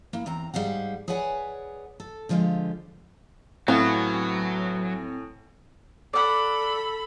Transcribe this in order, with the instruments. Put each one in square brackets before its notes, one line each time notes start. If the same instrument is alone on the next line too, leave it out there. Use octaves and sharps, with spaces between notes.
[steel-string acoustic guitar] A#3 E4
E2 C4 A#5
G#2 G3 G#4 F5 F#5
G#4 B4 C#5 D5 F#5 G#5
A4
D3 F3 G#3 F4 G4
[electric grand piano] A2 [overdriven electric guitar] F#3 [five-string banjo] B3 F5 [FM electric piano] C4 G#5
[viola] A4 B5 [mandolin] D5 F#5